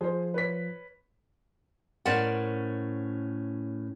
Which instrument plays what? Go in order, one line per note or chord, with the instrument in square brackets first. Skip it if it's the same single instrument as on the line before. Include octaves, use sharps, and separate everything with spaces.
[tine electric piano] F3 [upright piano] G#4 C5
[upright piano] B4 C#5 B6
[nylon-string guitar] A2 C#4 A#4 C5 D5 F#5